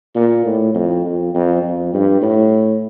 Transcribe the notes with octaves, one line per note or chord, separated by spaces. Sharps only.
A#2
A2
F2
F2
F2
F2
G2
A2